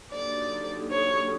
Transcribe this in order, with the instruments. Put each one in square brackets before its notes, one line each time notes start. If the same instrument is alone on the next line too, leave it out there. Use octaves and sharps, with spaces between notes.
[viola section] D3 F#3 A#3 D#4 G4 [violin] D5
[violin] C#5